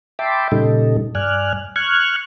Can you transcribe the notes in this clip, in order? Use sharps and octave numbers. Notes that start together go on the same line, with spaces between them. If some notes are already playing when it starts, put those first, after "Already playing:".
E5 G5 A5 B5 C6 D6
A#2 C#3 G3 D#4 A4
G2 D5 G#5 F6 F#6
C#6 F6 F#6 G#6